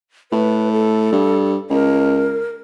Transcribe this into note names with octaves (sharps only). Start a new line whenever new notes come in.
A2 B4
A4
G2
C#2 A#4